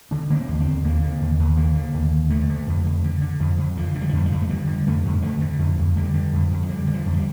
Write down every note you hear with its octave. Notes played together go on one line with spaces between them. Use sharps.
D3 D4
D3 A#3
C4
D#2
A#3
C4
D#2
D3 A#3
D3
D#2
D#2
D3 A#3
D3
D#2
D#2
D3 A3
D3
F2
F2
D3
D3
F2
F2
D3 F3
D3
G3
F3
F2 G3
F3
F2
A3
D3 G3
D3
F2 A3
F2
D3 A3
D3
F2
F2
D3 G3
D3
F2
F2
F3
D3 G3
D3
F3
F2
F3
G3